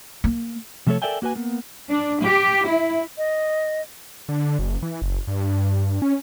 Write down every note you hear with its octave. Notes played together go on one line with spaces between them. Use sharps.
A#3
C3 F3 A3 G#4 A4 C#5
A4 A#4 D5 E5 G5 G#5
A#3 F#4 B4 G#5
A#3 B3
D4
G4
E4
D#5
D3
F#1
E3
F#1
G2
C#4